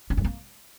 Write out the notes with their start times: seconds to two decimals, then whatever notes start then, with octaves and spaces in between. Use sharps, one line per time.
0.10 C#4
0.17 G2
0.25 A#3